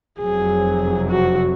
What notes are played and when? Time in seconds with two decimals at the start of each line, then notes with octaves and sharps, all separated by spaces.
0.20 F1 F2 C3 F#3 G#4
1.11 F#4